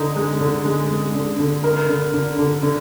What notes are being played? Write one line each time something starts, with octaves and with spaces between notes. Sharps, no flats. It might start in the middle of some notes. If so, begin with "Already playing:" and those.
Already playing: D3 D#4
G#3
D3
G#3
G#3
D3
D3
A#4
D3
D3
D3
D3